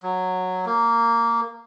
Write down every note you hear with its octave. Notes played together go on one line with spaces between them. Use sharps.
F#3
A#3